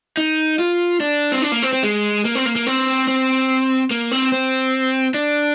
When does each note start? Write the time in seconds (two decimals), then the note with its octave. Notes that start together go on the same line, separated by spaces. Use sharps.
0.17 D#4
0.59 F4
1.00 D4
1.32 C4
1.42 D4
1.52 A#3
1.62 C4
1.73 C4
1.83 G#3
2.25 A#3
2.35 C4
2.46 A#3
2.56 A#3
2.66 C4
3.08 C4
3.91 A#3
4.11 C4
4.32 C4
5.14 D4